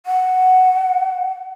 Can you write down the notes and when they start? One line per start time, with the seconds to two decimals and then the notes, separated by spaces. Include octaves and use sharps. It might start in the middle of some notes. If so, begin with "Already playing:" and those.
0.06 F#5